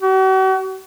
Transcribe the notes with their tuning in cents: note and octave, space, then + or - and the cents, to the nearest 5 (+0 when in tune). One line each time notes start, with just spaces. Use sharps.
F#4 +45